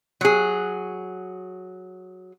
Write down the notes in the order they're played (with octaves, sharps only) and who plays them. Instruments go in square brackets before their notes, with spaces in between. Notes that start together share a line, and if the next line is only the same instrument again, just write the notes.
[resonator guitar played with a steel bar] F#3 G#4